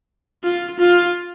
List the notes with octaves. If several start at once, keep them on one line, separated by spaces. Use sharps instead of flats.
F4
F4